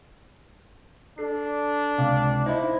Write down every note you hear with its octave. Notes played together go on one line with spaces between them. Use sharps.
D4 A4 C7
C#2 C3 F5 D6
D#4 E4 C5 D#5 G#6